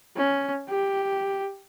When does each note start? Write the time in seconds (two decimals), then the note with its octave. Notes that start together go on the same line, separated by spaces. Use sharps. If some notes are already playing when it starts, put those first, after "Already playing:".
0.16 C#4
0.69 G4